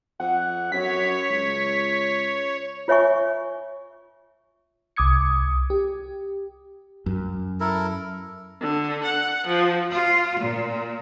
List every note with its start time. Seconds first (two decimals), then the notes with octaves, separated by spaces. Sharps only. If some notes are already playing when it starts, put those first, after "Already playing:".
0.20 F2 F#5
0.72 F#2 C#5 B6
1.29 C#2
2.88 F4 C#5 E5 G#5 C#6
4.96 C2 D6 D#6 G#6 C#7
5.70 G4
7.06 F#2
7.60 E4 A4 A#4
8.59 D3
9.04 F#5
9.46 F3
9.90 F4
10.38 A#2